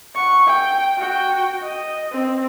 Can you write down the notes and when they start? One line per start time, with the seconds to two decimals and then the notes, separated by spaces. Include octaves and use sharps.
0.15 F#5 C#6
0.47 G5
0.97 F#4 G5
1.63 D#5
2.12 C4